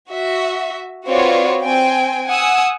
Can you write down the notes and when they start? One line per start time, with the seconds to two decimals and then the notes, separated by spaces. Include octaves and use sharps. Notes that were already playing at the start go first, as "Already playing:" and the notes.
0.11 F#4 E5
1.07 C4 F4 F#4 B4 C#5 D5
1.63 C4 G5 G#5
2.28 F#5 G#5 D#6 E6